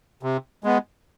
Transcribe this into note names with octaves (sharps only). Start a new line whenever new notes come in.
C3
G#3 B3